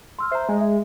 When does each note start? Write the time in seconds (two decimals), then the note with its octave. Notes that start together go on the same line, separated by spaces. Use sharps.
0.19 C6 E6 F6
0.31 C5 E5 A#5
0.49 G#3
0.61 E5